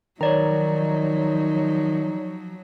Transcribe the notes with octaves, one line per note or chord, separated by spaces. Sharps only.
D#3 F3 F#3 D#4 C#5 D5 A#5